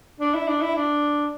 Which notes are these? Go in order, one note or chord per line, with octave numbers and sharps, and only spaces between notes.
D4
E4
D4
E4
D4